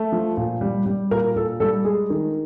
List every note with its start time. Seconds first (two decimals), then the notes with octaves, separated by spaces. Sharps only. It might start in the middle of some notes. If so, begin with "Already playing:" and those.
Already playing: A3
0.12 F3
0.37 A#2
0.61 G3
0.86 G3
1.11 A#2 A#4
1.36 A#2 A4
1.60 G3 A4
1.85 G#3 G#4
2.10 D#3